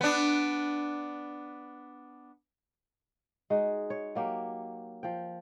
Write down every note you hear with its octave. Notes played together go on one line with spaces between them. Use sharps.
B3 D4
G#3 D#4 F#4
C#5
F#3 A#3 G4
F3 G5